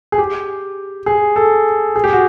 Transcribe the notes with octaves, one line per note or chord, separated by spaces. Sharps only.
G#4
G4
G#4
A4
G#4
G4
F#4